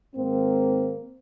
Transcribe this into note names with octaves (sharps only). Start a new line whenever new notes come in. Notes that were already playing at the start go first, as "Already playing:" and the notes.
G#2 D#3 A#3 C4